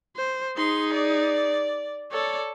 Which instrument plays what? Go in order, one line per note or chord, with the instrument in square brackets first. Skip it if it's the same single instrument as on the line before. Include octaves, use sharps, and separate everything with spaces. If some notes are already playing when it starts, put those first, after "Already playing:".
[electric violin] C5
[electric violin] D#4 G#4 [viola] C6
[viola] D5
[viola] A4 [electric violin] C#5 D5